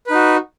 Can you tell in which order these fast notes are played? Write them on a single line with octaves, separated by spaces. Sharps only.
B4 D#4 F#4